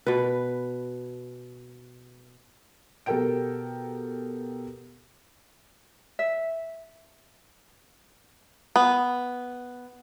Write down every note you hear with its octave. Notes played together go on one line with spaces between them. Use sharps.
B2 B4
B2 G4 A4 A#4 G5 D7
E5
B3